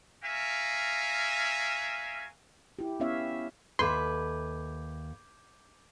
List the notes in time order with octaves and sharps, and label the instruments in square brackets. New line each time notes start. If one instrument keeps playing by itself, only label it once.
[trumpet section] F#4 A#4 E5 F5 G#5
[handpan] E4 G4
B3 C#4 E4 C#5 E5 F5
[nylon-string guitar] D#2 A4 E5 [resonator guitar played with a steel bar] B4 [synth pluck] C6 [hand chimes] D6 G6 G#6